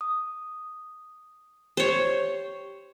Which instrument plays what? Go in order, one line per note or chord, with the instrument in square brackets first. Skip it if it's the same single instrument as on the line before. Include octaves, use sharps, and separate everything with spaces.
[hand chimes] D#6
[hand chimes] G4 [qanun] C5 C#5